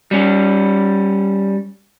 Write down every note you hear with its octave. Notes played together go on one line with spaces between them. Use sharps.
G3 C#4